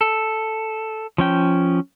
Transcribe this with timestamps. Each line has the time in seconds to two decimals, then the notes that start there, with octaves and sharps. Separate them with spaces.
0.01 A4
1.18 F3 C#4 G5